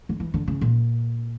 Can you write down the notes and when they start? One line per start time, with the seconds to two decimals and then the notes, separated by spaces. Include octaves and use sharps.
0.09 D3
0.20 E3
0.34 D3
0.48 C#3
0.61 A#2